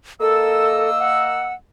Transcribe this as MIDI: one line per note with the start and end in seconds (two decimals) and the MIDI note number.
0.21 1.53 58
0.21 0.90 69
0.21 1.53 75
0.21 1.53 88
0.99 1.53 78